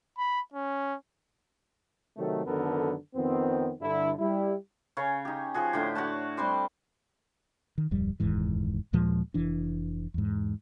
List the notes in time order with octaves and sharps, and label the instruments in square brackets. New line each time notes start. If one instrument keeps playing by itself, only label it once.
[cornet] B5
C#4
[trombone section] C3 D#3 F#3 A3
F#2 D3 D#3 B3 A4 A#4
F2 D#3 B3 C4
G2 D3 E4
G3 E4
[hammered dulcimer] C#3 C#4 C#5
D#4 G4
F3 F#4 G#4
A2 D3 G4
F#4 C#5 F#5 A5
G3 C4 C6 D6
[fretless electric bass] D#3
D1 F2 G3
F1 D#2 G#2 E3
D#2 A#2 F3 G#3
F1 E3 D4
E2 G#2